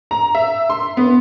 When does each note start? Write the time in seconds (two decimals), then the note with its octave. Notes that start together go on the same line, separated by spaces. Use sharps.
0.11 A#5
0.35 E5
0.70 C6
0.97 B3